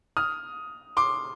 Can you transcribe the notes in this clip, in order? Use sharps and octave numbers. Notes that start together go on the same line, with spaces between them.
D#6 F6
C6 D6